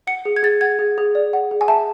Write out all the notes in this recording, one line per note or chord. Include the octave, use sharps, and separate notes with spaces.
F#5 C#7
G#4
G#6
G#4 A6
F#5 G#6
G#4
G#4
D5
F#5
G#4
G#5
E5 A5